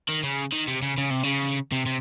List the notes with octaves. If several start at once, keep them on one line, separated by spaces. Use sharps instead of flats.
D#3
C#3
D#3
C3
C#3
C#3
C3
C#3
C3
C3